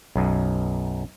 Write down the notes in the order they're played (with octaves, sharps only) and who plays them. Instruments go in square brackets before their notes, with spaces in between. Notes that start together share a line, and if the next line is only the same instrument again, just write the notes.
[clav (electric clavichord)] B1 F#2